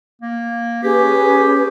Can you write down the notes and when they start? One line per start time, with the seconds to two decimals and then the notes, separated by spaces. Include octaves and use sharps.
0.22 A#3
0.83 C#4 G4 G#4 B4